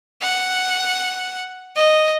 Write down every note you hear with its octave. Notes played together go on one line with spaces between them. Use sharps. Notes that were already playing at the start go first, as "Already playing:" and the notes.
F#5
D#5